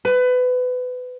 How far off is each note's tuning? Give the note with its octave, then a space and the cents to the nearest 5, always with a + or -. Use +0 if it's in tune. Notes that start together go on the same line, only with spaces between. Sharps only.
B4 +25